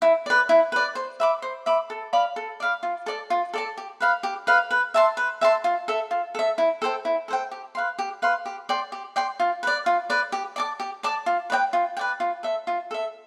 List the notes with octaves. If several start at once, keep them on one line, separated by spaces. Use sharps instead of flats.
E4
B4 D5
E4
B4 D5
C5
E5 B5 D6
C5
E5 B5 D6
A4
D5 F5 B5
A4
D5 F5 B5
F4
A4 D5 A5
F4
A4 D5 A5
G4
B4 F5 B5
G4
B4 F5 B5
B4
E5 A5 C6
B4
E5 A5 C6
F4
A4 E5
F4
A4 E5
E4
A4 C5 G5
E4
A4 C5 G5
G4
B4 F5 C6
G4
B4 F5 C6
G4
D5 G5 C6
G4
D5 G5 C6
F4
B4 D5
F4
B4 D5
G4
D5 A5 D6
G4
D5 A5 D6
F4
B4 D5 G5
F4
G5
B4 D5
F4
A4 E5
F4
A4 E5